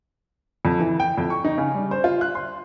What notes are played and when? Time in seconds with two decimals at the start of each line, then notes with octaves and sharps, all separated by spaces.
0.65 F2
0.80 E3
1.00 G5
1.18 F2
1.30 C#6
1.44 D#4
1.58 C#3
1.75 G3
1.91 C5
2.04 F4
2.21 F#6
2.35 C6